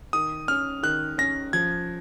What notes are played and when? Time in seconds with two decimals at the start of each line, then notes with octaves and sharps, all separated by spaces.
0.13 D#3 D#6
0.48 C#4 F6
0.83 D#3 F#6
1.18 C#4 A#6
1.53 F3 G#6